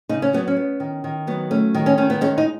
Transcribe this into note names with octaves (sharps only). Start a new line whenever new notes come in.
C#3 D#4
C#4
F#3 B3
C#4
B3
D#3
D#3
F#3 B3
A3 C#4
D#3
C#4
D#3 C#4
B3
G#3 C#4
D#4